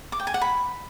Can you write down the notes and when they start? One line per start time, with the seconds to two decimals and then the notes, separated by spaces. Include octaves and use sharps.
0.12 D6
0.20 G5
0.27 G#5
0.34 F#5
0.41 B5